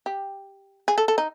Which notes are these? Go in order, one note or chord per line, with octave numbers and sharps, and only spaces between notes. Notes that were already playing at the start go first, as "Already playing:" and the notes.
G4
G#4
A4
A4
D#4